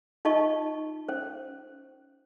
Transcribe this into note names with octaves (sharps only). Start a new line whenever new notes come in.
D#4 F4 D#5 A5 C#6
C#4 C5